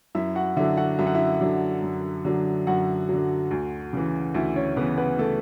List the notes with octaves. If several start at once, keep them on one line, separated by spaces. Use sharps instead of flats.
F#2 E4 E5
F#4 F#5
D3 F#3 E4 E5
F#4 F#5
F#2 E5
F#5
E4 E5
D3 F#3
F#2
D3 F#3
F#2 F#4 F#5
D3 F#3
D2
C#3 E3
D2 E4 E5
C#4 C#5
C#3 E3 B3 B4
B3 B4
A3 A4